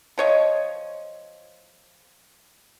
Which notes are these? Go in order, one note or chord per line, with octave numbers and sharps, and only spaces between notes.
F3 C#5 D#5